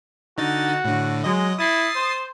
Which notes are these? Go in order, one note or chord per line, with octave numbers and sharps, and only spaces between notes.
D3 D#4 F#4 A6
A2 D3
F#3 G#3 D#5
E4 D#6 A6 C7
C5